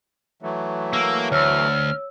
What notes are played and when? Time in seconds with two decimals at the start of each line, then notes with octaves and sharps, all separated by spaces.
0.42 E3 F#3 A3
0.93 A#3 E6
1.32 D2 C#5 E6 F6